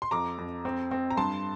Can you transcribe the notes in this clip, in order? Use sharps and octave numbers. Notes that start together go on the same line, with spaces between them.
C6
F2 A#5 D6
F2
C4
C4
A#5
G2 A5 C6